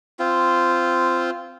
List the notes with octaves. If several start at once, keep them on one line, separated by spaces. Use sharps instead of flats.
C4 F4